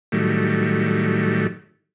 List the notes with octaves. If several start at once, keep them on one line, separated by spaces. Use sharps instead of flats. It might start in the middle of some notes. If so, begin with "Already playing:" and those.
A2 D#3 F#3 G3 A3